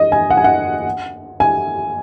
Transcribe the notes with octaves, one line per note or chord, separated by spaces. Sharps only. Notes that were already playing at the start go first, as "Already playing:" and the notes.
Already playing: D#5
G#5
F#5
G#5
F#5
G#5